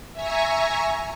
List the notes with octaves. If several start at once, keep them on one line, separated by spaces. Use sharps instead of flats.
E5 G#5 A#5 C#6